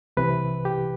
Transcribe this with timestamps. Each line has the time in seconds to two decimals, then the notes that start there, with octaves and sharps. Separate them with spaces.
0.17 C2 C3 E3 B4
0.65 G4